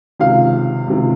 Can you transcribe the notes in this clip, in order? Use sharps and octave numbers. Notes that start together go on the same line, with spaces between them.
C#2 C3 D#3 F5
C#2 C3 D#3